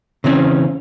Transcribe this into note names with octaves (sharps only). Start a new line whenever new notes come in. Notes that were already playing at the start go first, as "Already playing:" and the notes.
C#3 E3 C4 C#4